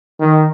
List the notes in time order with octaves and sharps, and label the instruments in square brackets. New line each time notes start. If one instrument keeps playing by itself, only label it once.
[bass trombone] D#3